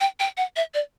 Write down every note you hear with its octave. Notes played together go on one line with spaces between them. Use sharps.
G5
G5
F#5
E5
D5